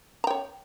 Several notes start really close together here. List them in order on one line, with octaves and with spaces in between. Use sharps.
A#5 G5 C#5